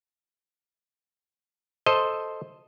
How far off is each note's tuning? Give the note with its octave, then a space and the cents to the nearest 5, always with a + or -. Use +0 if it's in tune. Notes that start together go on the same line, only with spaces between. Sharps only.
A4 +0 C5 +0 D#5 +0